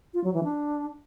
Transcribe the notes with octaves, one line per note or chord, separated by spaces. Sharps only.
F4
F#3
E3
D4